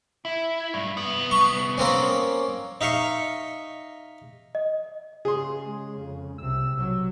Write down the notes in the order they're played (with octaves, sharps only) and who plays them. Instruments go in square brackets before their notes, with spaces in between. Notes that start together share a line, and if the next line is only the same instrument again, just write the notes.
[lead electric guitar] E4
G2
C2 B3
[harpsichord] C#6
A#3 C4 C#4
D#4 E5 F5 C#6
[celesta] D#5
[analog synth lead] C#3 [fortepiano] G#4 C6
[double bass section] G#3
F2
[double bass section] C2 C3 [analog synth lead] E6
[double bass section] B1 F#3